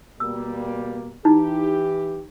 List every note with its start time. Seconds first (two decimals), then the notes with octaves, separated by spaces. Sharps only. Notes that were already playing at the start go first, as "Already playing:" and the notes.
0.20 B2 G3 A#3 E6
1.25 E3 D#4 E4 G4